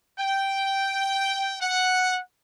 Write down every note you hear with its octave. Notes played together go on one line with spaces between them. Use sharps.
G5
F#5